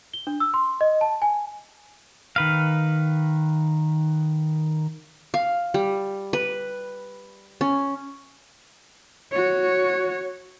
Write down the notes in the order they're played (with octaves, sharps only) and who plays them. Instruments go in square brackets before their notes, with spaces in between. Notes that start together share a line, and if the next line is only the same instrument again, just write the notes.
[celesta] G7
D4
E6
C6
D#5
A5
G#5
[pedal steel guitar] D#3 B4 F5
[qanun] F5
G3
B4
C#4
[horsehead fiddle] F#4 C#5